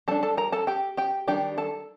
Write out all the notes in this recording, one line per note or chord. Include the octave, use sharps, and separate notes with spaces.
G3 D4 A4 A5
A4 A5
A#4 A#5
A4 A5
G4 G5
G4 G5
D#3 G3 D4 G4 G5
A4 A5